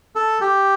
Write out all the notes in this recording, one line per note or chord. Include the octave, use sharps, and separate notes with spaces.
A4
G4